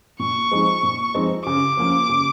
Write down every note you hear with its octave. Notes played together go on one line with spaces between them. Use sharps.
A#2 C#6
F3 G#3 C4 D#4
A#2
F3 G#3 C4 D#4
C#3 D6
F3 A#3 C#4
C#3